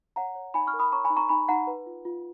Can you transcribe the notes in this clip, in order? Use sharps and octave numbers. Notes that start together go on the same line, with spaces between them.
C#5 F#5 A#5
C#5
D#4 G#5 B5
C#6 F6
A#4
B5 D#6
C#5 A#5 C#6
G#5 B5
D#4
A#5 C#6
D#4 G#5 B5
D#4 F#5 A#5
B4
F4
F4